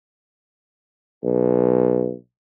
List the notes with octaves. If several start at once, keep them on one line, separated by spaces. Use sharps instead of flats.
B1